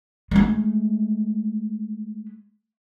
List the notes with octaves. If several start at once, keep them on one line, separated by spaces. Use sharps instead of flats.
G#3 A3